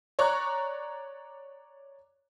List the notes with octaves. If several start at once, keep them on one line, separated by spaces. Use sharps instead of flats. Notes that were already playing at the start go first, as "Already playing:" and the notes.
C#5 D5 A#5 C#6 F#6